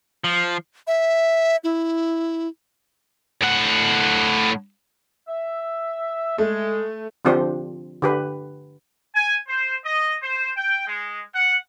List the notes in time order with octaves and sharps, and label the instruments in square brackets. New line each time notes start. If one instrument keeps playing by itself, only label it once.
[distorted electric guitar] F3
[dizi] E5
E4
[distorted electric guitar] A2 F#5
[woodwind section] E5
[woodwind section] G#3 [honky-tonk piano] A3
[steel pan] D3 F3 C4 D4 G4 C5
D3 G4 B4
[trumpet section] G#5
C5
D#5
C5
G5
G#3
F#5